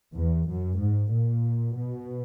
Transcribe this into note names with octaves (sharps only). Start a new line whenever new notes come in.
E2
F#2
G#2
A#2
B2